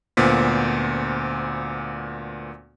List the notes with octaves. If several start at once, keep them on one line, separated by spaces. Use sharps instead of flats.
D2 A#2 B3 C5 B6